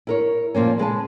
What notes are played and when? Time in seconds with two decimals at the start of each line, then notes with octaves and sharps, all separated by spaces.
0.07 E4 A#4 C#5
0.55 A#2 F3 A#3 C#4
0.78 C#3 G#3 B4 A5